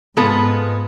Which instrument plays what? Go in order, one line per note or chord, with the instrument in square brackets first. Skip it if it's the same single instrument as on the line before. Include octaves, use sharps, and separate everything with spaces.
[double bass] G#2 [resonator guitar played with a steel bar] G#3 B3 F4 A4